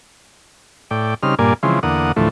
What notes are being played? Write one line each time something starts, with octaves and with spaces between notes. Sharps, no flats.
A2 D5 G5
C#3 G3 C4 D#4 F6
G2 A#2 A#3 D5 G#5
C#3 E3 F3 G#3 C4
E2 D3 A#3 F#5 D#6
D2 A2 E3 F3 A3